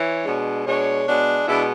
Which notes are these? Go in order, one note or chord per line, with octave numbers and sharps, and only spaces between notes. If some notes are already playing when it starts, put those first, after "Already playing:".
Already playing: E3 C#5
B2 G#3 D4
B2 G#3 D4 C#5
B2 G#3 D4
B2 G#3 D4 E4